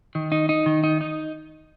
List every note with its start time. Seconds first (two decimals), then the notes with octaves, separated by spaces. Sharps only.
0.15 D#3
0.32 D#4
0.49 D#4
0.66 D#3
0.84 D#4
1.01 D#4